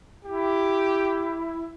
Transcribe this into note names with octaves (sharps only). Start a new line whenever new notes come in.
E4 G4